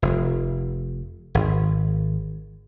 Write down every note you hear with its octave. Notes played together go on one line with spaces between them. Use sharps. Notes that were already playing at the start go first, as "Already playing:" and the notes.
F1
G#1